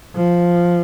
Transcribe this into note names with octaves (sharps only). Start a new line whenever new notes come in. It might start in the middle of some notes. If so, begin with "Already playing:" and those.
F3